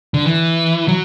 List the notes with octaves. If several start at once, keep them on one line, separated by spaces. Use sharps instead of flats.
D3
E3
F#3